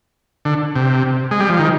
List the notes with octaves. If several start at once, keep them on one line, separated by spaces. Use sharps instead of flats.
D3
C3
G#3
G3
F3
D#3